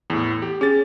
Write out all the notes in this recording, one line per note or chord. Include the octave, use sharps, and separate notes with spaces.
E2 A2
G4
C#4 G#4 A6